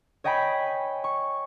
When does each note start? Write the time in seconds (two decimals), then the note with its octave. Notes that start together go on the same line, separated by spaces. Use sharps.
0.24 C#5 D#5 G5 G#5 B5
1.04 C#6